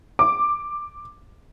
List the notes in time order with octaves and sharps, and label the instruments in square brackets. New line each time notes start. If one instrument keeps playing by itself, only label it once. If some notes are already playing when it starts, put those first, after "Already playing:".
[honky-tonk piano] D6